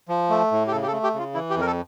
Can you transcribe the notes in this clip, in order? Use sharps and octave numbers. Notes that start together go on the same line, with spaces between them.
F3
A3
A2
G4
C#3 A4
G4
A4
A3
G4
C#3 F4
E3 E4
G4
F2
A#4
A4